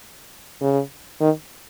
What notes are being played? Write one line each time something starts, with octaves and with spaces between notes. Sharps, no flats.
C#3
D#3